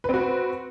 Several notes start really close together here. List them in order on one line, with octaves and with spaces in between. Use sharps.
B4 C4 F#4